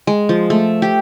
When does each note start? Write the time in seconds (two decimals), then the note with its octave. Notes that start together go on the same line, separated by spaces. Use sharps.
0.07 G#3
0.29 F3
0.50 A3
0.82 G4